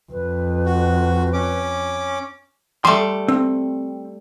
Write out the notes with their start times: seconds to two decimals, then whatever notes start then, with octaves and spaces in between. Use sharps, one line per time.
0.12 F2 B4
0.66 F#4
1.33 C#4 D6
2.85 G3 A3 C6
3.28 C4